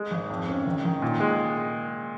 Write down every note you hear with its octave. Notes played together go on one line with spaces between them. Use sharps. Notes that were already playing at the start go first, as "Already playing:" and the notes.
Already playing: G#3
G#1
F2
C#4
D#3
D#3
A#2
G#3